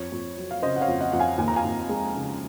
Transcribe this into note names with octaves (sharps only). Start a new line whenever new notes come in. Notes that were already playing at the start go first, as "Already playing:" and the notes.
Already playing: F2 C#5
F2
F#3
F5
C#3 C5 D#5
F#5
C#5 F5
F2
D#5 F#5
F2 F#5
F5 G#5
D#2 G#5
A#5
F5 G#5
D#2
G#3
C#3